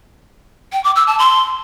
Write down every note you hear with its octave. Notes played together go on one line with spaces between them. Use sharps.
G5
D6
E6
A5
C6